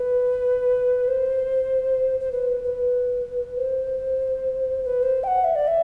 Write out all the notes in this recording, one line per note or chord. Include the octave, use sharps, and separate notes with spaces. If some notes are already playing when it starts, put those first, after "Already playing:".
Already playing: B4
C5
C5
B4
B4
C5
C5
B4
C5
G5
F#5
E5
D5
E5